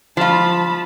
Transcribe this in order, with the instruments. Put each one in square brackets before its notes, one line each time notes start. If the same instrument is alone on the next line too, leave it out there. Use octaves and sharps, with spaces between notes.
[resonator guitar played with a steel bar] F3 F4 [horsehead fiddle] A5 B5